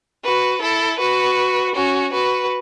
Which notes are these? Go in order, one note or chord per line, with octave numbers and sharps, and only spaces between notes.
F#4 B4
E4 A4
F#4 B4
C#4 F#4
F#4 B4